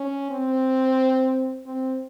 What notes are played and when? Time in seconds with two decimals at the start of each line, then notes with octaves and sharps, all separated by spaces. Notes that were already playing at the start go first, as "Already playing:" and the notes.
Already playing: C#4
0.31 C4
1.67 C4